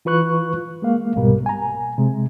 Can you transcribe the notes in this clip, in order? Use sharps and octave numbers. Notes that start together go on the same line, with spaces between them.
E3 F4 B4 C#6 F#6
G#3 A#3 F5
C2 G#2 B2 G3 A#4
G#5 A#5
C3 G#3